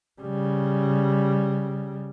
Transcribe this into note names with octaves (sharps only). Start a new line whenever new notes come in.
C#3 G3